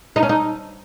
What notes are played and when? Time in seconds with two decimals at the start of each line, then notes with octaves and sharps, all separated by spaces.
0.16 D#4
0.23 C#4
0.29 D#4